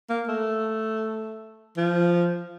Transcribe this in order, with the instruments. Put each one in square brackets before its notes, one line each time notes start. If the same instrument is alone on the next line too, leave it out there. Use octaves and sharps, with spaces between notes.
[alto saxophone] A#3
A3
F3